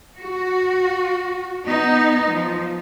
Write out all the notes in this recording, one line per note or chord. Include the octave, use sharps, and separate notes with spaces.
F#4
B3 D#4
F3